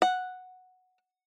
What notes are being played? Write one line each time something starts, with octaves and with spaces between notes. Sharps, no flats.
F#5